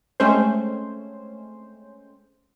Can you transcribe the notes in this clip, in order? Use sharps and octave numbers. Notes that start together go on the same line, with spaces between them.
G#3 A3 C4 C#4 C5